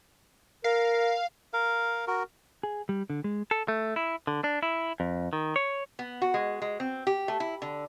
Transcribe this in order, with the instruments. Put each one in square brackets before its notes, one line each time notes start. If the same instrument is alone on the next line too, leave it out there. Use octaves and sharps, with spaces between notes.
[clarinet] A#4 [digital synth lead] F5
[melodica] A#4 F5
F#4 A#4
[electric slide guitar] G#4
G3
D3
G#3
[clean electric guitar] A4
A3
E4
D3
D4
E4
F2
D#3
C#5
[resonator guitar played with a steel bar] B3
F#4
G#3
G#3
C4
G4
A3
E4
D3